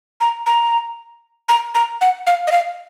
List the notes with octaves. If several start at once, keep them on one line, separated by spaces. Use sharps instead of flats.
A#5
A#5
A#5
A#5
F#5
F5
D#5
F5